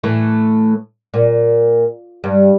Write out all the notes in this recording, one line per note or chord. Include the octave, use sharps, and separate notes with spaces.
A2 E3 A3
A#2
G2